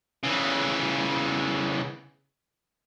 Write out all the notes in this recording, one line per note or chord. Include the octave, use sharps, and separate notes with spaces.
C#3 E3